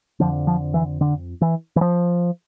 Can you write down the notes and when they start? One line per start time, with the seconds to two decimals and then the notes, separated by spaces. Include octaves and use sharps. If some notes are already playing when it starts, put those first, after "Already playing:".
0.20 F2 D3 F3
0.47 F3
0.74 E3
1.01 D3
1.41 E3
1.76 E3
1.81 F3